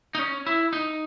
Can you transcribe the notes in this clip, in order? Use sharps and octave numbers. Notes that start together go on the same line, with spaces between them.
D#4
C#4
E4
D#4